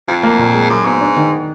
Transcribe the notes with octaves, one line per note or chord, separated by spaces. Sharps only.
F2 F4
A#3
A#2
G#3
F#2 F#3
G#2 B3
D4
D#3